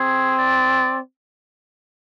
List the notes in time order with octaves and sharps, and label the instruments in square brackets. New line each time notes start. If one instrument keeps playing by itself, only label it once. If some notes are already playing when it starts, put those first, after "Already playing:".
Already playing: [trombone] C4 [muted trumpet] G#4
[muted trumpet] D5